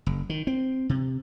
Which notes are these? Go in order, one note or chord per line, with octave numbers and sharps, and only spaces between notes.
F#1
D#3
C4
C3